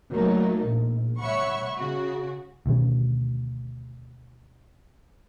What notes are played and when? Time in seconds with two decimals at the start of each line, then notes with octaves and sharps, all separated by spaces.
0.13 F#3 A3 A#3 D#4
0.65 A#1
1.19 C#5 E5 F#5 B5 C#6
1.78 C#3 F#4
2.66 D2 B2 D#3 C#4